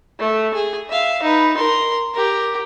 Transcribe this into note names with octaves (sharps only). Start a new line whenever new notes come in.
A3
G#4
E5 F5
D#4 B4
A#4 C6
G4 A#4